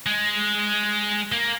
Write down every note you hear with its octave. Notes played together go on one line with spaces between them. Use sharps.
G#3
A#3